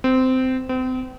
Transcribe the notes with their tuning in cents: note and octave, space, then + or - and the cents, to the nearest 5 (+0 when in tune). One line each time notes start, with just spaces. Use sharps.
C4 -15
C4 -35